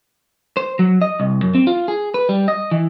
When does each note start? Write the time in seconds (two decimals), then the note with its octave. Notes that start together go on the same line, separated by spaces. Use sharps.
0.57 C5
0.79 F#3
1.02 D#5
1.20 C2
1.42 F#2
1.55 C4
1.67 F4
1.88 G#4
2.14 B4
2.29 G3
2.48 D#5
2.71 E3